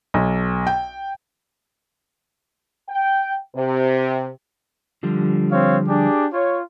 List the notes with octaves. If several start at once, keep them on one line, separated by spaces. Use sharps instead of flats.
B1
G5
G5
C3
D3 F3 G3
C4 C#5 F5
D4 G4 G#4
F4 C#5